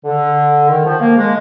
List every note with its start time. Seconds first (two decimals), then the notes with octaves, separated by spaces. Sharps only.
0.05 D3
0.69 D#3
0.85 F3
1.01 A#3
1.17 G#3